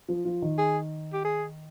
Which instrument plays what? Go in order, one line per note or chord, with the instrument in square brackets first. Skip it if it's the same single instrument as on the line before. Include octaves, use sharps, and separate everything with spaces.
[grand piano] F3 F4
F3 F4
D#3 D#4
[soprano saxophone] G#4
G4
G#4